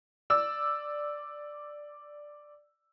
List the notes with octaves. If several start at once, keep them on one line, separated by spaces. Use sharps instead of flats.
D5 E6